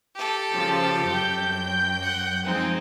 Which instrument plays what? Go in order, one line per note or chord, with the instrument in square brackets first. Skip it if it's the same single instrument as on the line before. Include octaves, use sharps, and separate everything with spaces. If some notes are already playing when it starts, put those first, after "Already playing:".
[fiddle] G4 A4
[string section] C#3 F3
F#2 G5 G6
[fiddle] F#5
[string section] F3 G#3 D#4 [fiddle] C4